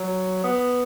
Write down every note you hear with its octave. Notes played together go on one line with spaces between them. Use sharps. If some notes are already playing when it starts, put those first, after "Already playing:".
Already playing: F#3
B3